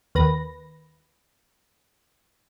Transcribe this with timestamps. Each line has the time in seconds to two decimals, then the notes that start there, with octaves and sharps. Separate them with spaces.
0.15 D#2 B4 A#6